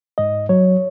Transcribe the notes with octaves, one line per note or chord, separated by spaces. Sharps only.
G#2 D#5
F#3 C#5